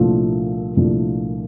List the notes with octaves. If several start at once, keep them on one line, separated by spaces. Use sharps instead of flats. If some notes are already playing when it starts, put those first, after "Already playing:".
Already playing: C2 A#2 F3 A3 D4
C2 A#2 F3 A3 D4